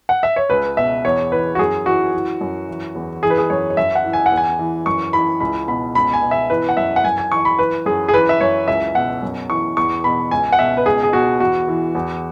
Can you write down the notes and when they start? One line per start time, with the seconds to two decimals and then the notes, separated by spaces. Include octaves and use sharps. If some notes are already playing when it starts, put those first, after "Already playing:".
0.09 F#5
0.23 E5
0.36 C#5
0.50 C#2 B4
0.77 B2 E5
1.05 E2 C#5
1.32 E3 B4
1.55 F#4
1.59 F#2 G#4
1.86 E3 F#4
2.13 E3
2.41 F#2
2.68 E3
2.95 E2
3.23 E3 G#4
3.30 B4
3.38 G#4
3.50 F#2 C#5
3.70 C#5
3.77 F#2 E5
3.95 F#5
4.05 E3
4.13 G#5
4.26 F#5
4.32 E2
4.37 G#5
4.59 E3
4.86 F#2 C#6
5.13 E3 B5
5.40 C#2 B5
5.68 B2 B5
5.95 C#2 B5
6.13 G#5
6.23 B2
6.31 E5
6.50 E3 B4
6.69 F#5
6.77 F#2 E5
6.96 F#5
7.04 F#2 G#5
7.18 G#5
7.31 E3 C#6
7.45 B5
7.59 E3 B4
7.86 F#2 G#4
8.08 G#4
8.13 E3 B4
8.29 E5
8.41 F#2 C#5
8.68 C#2 E5
8.95 B2 F#5
9.23 F#2
9.49 E3 C#6
9.77 E2 C#6
10.04 B2 B5
10.31 C#2 G#5
10.53 F#5
10.59 B2 E5
10.77 B4
10.86 C#2 G#4
11.03 G#4
11.13 B2 F#4
11.40 E2 F#4
11.68 E3
11.95 E2